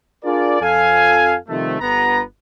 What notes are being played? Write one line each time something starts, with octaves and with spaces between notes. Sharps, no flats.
D4 F4 G#4 A#4 D5
F2 A4 F5 G#5
C3 D#3 F3 G3 A3
G1 B3 A#5